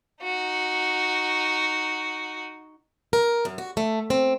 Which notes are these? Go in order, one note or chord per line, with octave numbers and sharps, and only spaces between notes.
D#4 F#4
A#4
F#2
F#4
A3
C4